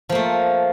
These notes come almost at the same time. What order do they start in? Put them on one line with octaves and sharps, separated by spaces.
F3 A#3 A3